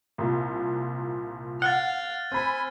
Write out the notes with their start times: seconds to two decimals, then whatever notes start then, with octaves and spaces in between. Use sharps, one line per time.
0.18 C2 A#2
1.62 F5 F#5 F6 F#6 A6
2.32 C4 G#5 B5